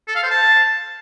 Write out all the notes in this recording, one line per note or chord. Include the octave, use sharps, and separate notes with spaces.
A4
F5
C5
A5